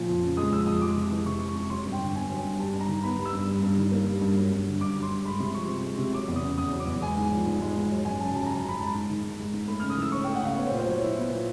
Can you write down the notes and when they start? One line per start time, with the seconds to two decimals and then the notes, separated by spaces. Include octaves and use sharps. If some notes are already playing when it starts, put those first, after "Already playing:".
Already playing: A#2 F3
0.08 F2
0.23 C#3
0.37 G#3 D#6
0.52 F3 E6
0.67 F2 D#6
0.81 G#3 D6
0.96 C3
1.11 E3
1.26 C3 C#6
1.41 G#3
1.48 C#6
1.55 C3
1.70 F#3 C6
1.85 G2
1.92 G5
2.00 D3
2.15 B3 G#5
2.30 F#3
2.44 G2
2.59 G3 A5
2.74 G2
2.81 A#5
2.88 D#3
3.03 B3 B5
3.18 G3
3.26 E6
3.32 G2
3.47 G3
3.63 G2
3.78 D#3
3.92 A#3
4.06 G3
4.21 G2
4.37 F#3
4.52 G2
4.67 D3
4.81 G2 D6
4.96 F#3
5.03 C6
5.11 G2
5.24 G#3 B5
5.40 C3 C6
5.55 F3 C#6
5.69 C4
5.84 G#3
5.98 C3
6.14 F#3 D6
6.28 E2
6.36 D#6
6.43 C#3
6.58 E2 D#6
6.72 F#3
6.80 D6
6.87 E2
7.02 G#3 G#5
7.17 G#2
7.32 F3
7.47 G#2
7.61 G#3
7.77 G#2
7.91 F#3
8.05 F#2 G#5
8.20 C#3 A5
8.35 F#2 A5
8.46 A#5
8.50 F#3
8.57 A#5
8.64 F#2 B5
8.79 G#3 A5
8.95 G#2
9.10 D#3
9.23 G#2
9.39 G#3
9.54 G#2
9.68 A3 B5
9.80 F6
9.82 C#3
9.90 D#6
9.97 E3 E6
10.12 C#4 C#6
10.24 G5
10.27 A3
10.35 F#5
10.42 C#3 F5
10.57 B3 C#5
10.67 C5
10.71 A#2
10.79 C5
10.86 F#3 C#5
11.01 E4
11.17 B3
11.30 A#2